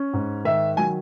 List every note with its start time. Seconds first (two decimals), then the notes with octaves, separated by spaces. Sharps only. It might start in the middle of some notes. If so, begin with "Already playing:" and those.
Already playing: C#4
0.13 G#2
0.45 D#3 E5
0.77 F#3 G#5